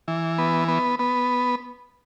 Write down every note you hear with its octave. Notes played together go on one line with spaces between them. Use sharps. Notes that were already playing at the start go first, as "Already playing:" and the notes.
E3
B3
B3
B3